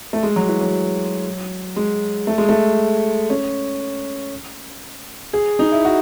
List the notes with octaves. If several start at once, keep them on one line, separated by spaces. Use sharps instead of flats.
A3
G#3
F#3
E3
F#3
G#3
A3
G#3
A3
C#4
G#4
D#4
E4
F#4